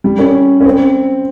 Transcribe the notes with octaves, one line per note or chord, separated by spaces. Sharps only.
G3
C#4
C#4
C4